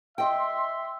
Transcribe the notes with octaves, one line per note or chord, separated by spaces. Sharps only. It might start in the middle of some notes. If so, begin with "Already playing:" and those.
D#5 E5 G5 C6